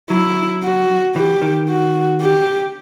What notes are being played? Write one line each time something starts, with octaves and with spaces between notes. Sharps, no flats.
F#3 E4
F#4
E3 G4
D#3
F#4
G4